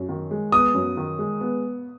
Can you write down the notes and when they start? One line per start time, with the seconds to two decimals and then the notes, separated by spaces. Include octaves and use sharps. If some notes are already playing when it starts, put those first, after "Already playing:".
Already playing: F#2
0.09 D#3
0.31 G#3
0.52 B3 D#6
0.75 F#2
0.97 D#3
1.19 G#3
1.41 B3